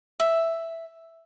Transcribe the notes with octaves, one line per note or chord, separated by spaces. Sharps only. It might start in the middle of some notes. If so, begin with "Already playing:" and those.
E5